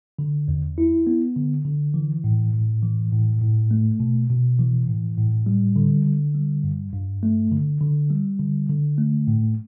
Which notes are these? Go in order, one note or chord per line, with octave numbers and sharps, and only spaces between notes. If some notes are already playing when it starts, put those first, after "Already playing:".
D3
E2
E4
B3
D3
D3
E3
A2
A2
E3
A2
A2
A3
B2
B2
E3
A2
A2
G3
D3
D3
G3
G2
G2
A3
D3
D3
G3
D3
D3
A3
A2